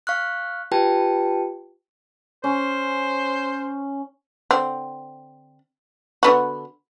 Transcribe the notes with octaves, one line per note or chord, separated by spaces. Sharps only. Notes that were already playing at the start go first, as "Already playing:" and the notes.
F5 C#6 F6 F#6
F4 G4 B4 G5 A5
C#4 C5
D3 C4
D3 B3 F#4